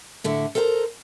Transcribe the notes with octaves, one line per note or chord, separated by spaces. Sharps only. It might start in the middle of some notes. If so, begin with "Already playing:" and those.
A2 D3 E5 F#5
A4 A#4 C5 F#5 A#5